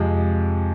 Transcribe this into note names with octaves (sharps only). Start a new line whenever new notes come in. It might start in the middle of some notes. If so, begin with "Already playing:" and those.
Already playing: F2 C3 F3 G#3